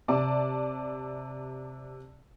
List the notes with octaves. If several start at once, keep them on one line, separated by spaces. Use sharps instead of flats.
C3 D5 A5